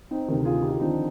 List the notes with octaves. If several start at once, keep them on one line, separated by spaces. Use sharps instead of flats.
C4 D#4
D2 C3 D#3
F4 G#4
D#4 G4
F4
D#2 D3 F3 C4 D#4